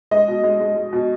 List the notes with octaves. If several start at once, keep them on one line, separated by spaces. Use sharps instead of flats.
G#3 D#5
B2
G#3
G#3
G#3
B2